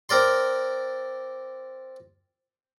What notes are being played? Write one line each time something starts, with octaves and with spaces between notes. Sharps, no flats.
C4 A#4 D5 C6